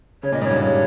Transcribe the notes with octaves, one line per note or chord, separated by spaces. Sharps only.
C#3 C#5
A#2 D#5
G#2 C#5
G2
G2 C#5